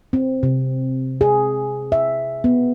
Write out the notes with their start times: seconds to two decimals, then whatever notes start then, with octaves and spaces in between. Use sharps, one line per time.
0.13 C4
0.43 C3
1.21 G#4
1.92 E5
2.44 B3